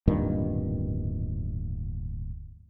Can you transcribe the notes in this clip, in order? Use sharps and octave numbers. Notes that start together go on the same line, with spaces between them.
D1 G2 A#2 D#3